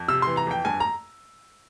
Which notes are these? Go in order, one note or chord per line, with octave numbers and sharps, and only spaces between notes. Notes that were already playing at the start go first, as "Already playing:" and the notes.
Already playing: F2
C3 E6
E3 C6
A#5
F2 G5
G2 G#5
A#5